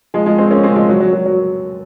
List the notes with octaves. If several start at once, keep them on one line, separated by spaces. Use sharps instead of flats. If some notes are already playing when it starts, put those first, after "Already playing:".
F3 G#3
F3 G#3
G#3 C4
A#3 C#4
G#3 C4
F3 G#3
F#3
F#3
F#3
F#3